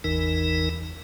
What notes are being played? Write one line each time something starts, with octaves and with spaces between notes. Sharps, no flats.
G#1 E2 E3 D#4 A#4